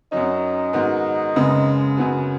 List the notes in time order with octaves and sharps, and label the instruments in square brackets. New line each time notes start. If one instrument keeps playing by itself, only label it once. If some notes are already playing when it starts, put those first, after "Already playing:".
[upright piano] F#2 F#3 C#4 [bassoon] D#4
[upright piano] G#2 D#3 B3 F#4
F#2 C#3 G#3 B3
F#2 C#3 B3 F#4